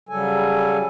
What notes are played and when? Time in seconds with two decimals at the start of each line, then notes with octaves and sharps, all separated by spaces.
0.09 C#3 F#3 G3 A4 G#5